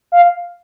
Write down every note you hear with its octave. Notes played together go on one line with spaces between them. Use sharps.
F5